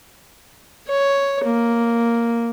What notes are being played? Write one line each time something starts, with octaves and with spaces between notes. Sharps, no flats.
C#5
A#3